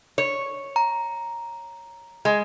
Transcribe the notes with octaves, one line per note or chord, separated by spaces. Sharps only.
C#5
A#5
G#3